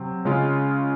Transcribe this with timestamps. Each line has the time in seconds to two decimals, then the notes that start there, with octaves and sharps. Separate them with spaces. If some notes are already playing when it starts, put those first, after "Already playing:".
Already playing: C3 F#3 C4
0.25 C#3 G#3 C#4 F4